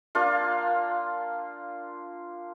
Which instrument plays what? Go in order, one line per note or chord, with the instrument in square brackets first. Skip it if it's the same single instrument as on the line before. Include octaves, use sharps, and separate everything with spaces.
[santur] A#3 D4 F4